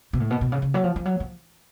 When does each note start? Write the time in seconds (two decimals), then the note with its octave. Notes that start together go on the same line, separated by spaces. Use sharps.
0.13 B2
0.20 A2
0.30 B2
0.41 B2
0.52 C#3
0.62 C#3
0.74 F#3
0.84 F3
0.96 F3
1.05 F#3
1.20 F3